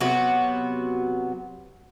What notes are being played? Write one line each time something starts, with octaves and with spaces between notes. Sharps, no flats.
C3 F#3 B3 F#4